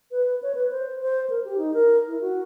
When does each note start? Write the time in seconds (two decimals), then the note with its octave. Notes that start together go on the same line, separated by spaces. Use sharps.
0.11 B4
0.43 C#5
0.55 B4
0.71 C5
1.02 C5
1.30 A#4
1.45 G4
1.58 D#4
1.74 A#4
2.07 E4
2.21 F#4